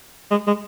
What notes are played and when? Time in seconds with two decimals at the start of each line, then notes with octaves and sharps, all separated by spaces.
0.31 G#3
0.47 G#3